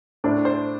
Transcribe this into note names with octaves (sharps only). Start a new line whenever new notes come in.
A2 A3 D4 C5
C5